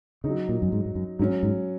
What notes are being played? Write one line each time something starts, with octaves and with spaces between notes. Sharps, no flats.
C#3 F#3 D#4
A#2
F#2
G#2
G#2
F#2
G#2 F#3 C#4
G#2